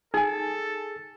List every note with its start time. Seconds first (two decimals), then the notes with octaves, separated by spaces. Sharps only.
0.14 D#4 G#4 A4 G#5